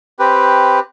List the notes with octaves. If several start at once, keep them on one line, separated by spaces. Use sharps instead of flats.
C4 G4 B4